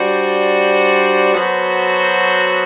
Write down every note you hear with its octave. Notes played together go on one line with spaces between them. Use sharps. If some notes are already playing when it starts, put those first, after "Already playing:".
Already playing: G3 D4 F#4 C5
F#3 B3 F#4 A4 C5